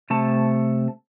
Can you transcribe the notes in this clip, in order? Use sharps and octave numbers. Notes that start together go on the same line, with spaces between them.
C3 A3 A5